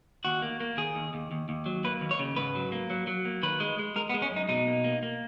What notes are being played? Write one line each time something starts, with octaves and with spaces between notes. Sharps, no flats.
D#2 F#4
A#3
A#3
D#3 G#4
D#2
D#2
D#2
D#2
F#3
A#3 B4
D#2
C#5
C#3
G#2 B4
F#3
A#3
F#3
F#3
A#3
D#3 B4
G#3
G#3
G#3 A#4
B3
G#3
C#4
F#2
D#4
B2 D#4
A#3
A#3
A#3